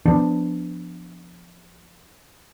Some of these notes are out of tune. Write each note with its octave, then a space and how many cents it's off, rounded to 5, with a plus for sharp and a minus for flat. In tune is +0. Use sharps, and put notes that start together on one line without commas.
F3 +0 B3 +10 D4 +0